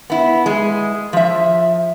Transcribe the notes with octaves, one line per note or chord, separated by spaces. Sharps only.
B3 E4
G#3
F3 E5